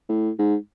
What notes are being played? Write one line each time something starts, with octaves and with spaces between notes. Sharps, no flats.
A2
G#2